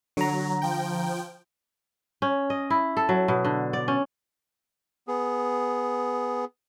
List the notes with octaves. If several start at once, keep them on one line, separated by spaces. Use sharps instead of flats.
D3 F#3 A#5
F3 G5
C#4
D#5
E4
A4
F#3
B2
D3
D5
C#4
B3 G#4